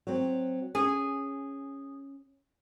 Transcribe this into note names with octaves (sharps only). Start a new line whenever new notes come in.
F#3 C4
C#4 G#4